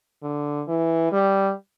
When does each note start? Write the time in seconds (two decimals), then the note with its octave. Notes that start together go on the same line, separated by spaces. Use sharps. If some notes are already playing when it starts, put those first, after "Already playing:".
0.22 D3
0.68 E3
1.12 G3